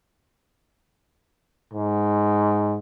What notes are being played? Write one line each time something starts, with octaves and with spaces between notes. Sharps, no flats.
G#2